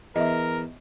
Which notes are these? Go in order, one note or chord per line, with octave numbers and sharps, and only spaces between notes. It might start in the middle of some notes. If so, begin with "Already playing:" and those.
E2 A#4 D#5 E5